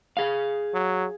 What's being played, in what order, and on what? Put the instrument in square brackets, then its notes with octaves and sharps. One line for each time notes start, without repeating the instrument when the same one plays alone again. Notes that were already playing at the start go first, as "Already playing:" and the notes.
[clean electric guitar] G#4 F5
[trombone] F#3